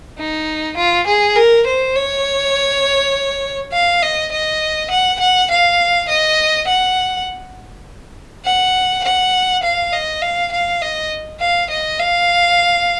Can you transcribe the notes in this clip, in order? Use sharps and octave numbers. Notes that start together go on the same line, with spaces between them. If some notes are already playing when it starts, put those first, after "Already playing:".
D#4
F4
G#4
A#4
C5
C#5
F5
D#5
D#5
F#5
F#5
F5
D#5
F#5
F#5
F#5
F5
D#5
F5
F5
D#5
F5
D#5
F5